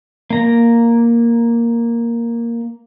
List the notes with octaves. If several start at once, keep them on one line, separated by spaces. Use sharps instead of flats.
A#3 A#5